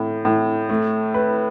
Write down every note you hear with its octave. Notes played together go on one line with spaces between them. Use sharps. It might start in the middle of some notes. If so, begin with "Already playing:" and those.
Already playing: A2
A2
A3
B4